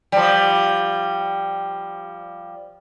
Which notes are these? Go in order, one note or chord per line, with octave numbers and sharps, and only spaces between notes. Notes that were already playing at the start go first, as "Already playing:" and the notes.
F3 G3